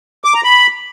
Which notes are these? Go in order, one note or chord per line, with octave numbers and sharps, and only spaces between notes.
D6
A#5
B5